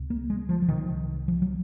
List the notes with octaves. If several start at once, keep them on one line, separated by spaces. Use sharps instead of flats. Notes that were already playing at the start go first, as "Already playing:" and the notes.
Already playing: C#2 C3
A#3
G#3
F3
F3
C2 C3 D#3
F3
F#3